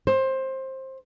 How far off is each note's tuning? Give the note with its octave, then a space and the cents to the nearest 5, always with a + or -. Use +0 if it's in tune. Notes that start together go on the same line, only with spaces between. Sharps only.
C5 +20